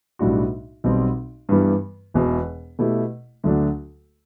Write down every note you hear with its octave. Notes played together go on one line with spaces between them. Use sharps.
B1 A2 G3 D4 F#4
B1 B2 G3 C4
G2 E3 G3 B3
E1 E2 B2
B2 A3 E4 G4
D2 D3 F#3 A3 D4